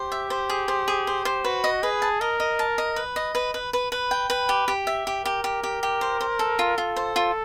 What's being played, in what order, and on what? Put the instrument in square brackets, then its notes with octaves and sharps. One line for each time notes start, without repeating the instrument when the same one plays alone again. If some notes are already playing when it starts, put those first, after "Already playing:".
Already playing: [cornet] G4 [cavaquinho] C5
[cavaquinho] E5
C5
G#4
C5
G#4
C5
C5
[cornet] F#4 [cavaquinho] B4
[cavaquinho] D#5
[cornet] G#4 [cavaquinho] B4
[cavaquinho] A5
[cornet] A#4 [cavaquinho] D#5
[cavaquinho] D#5
A5
D#5
B4
D#5
B4
B4
B4
B4
G5
B4
G4
G4
E5
G4
[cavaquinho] G4 [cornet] A#4
[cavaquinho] G4
G4
G4
C5
C5
A4
F4
[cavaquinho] F4 [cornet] A4
[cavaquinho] C5
F4